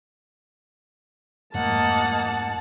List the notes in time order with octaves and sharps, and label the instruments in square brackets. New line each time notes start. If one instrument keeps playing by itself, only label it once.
[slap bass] F2 G#2 A3 [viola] A#3 D#5 [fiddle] F#5 [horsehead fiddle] A5